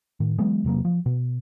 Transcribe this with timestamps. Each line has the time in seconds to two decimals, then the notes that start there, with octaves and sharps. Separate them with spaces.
0.20 A2 D#3
0.38 E3 F#3 G#3 B3
0.64 E1 C3 F#3 A#3
0.85 F3
1.06 B2